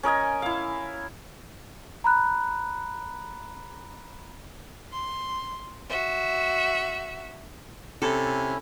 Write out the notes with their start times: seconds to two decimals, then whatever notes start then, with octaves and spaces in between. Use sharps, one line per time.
0.03 C#4 A#4 D#5 G#5
0.42 E4 F5
2.04 A#5 B5 F#6
4.92 C6
5.90 F#4 E5
8.02 C3 C#4 E4 A4